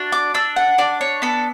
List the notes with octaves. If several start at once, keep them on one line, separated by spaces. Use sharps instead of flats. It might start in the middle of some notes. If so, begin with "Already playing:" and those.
Already playing: D4 F#4
D6
D4 E6
F#5
D4 D5
C#5
B3 A4